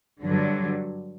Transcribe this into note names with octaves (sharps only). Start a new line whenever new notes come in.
G2 D3 F#3